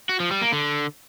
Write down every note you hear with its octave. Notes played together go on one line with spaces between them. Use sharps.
F#4
F3
G3
A#3
D3